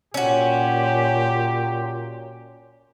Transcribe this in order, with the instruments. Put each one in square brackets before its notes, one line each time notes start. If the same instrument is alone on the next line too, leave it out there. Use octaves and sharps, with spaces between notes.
[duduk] A#2 [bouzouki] C#4 F#4 [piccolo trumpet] G4